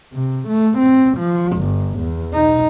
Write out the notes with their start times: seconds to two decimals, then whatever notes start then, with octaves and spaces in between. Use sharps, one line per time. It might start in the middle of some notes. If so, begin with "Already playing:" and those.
0.14 C3
0.49 A3
0.79 C4
1.18 F3
1.58 G1
1.99 E2
2.34 D#4